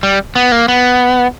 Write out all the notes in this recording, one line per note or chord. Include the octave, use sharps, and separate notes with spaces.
G3
B3
A#3
B3